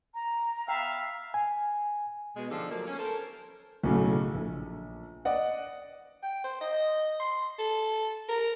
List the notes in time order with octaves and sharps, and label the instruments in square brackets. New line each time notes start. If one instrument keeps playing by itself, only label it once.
[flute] A#5
[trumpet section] B3 E5 F5 [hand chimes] G5
[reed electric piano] G#5
[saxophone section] B2 G#3
D3 F3 D4 D#4 G4 A4
F3 F#3 A3 A#3
C#4
A4 A#4 C5
[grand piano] B1 A2 C#3 F#3 A3
A#1
D5 D#5 F#5
[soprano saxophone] G5
C5
D#5
C6
A4
A#4